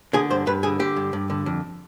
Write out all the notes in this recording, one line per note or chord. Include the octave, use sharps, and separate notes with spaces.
D3 G#4
G2 C5
G2 B4
D3 G#4
D3 G4
G2
G2
D3
F2